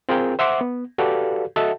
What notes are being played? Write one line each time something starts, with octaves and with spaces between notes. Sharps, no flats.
C4 F4 G#4 A#4 G5
C5 E5 F#5 C6 D6
B3
F#4 G4 A4 B4 D5 F5
F#4 A4 D#5 E5 F#5 A5